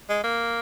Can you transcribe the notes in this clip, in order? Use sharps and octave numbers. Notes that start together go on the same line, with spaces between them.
G#3
A#3